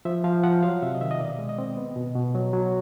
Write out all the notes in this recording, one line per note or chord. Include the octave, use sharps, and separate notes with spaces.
F3 E5
F3 F5
F3 F#5
F#3 F5
C3 E5
D#5
D#3 E5
D#5
B2 D5
G#3
D#5
C4
B3
B2
B2
F#3
F#3